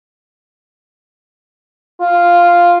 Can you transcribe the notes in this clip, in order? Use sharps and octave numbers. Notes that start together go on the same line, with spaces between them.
F4